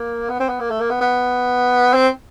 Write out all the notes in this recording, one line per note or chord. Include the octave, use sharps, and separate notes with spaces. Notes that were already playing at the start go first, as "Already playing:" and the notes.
Already playing: A#3
B3
C4
B3
A#3
A3
A#3
B3
B3
C4